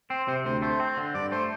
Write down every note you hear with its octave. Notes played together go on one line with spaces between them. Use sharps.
C4 C5
C3 C5
D2 C5
A3 C5
C4
D3
G2 D5
A3 C5